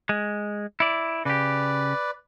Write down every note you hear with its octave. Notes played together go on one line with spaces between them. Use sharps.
G#3
E4 D5
C#3 G4 B4 D5